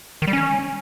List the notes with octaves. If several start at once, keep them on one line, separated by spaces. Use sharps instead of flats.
D#3
G3
C#4